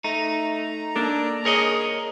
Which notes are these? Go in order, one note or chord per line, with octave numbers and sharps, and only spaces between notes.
A3 D#4 A#5
A#3 D4 A4 D5
G#4 A#4 C#5 D#5